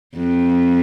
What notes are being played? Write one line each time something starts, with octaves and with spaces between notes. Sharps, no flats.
F2